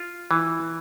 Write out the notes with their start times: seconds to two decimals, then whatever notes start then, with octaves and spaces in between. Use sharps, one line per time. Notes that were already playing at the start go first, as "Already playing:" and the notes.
Already playing: F4
0.31 E3